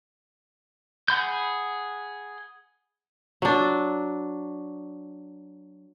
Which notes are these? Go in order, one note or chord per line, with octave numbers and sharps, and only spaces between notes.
G#4 F#5 B5 G6
F#3 D4